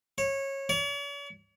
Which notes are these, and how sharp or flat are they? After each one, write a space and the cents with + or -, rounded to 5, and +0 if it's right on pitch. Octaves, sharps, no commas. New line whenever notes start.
C#5 -20
C#5 +45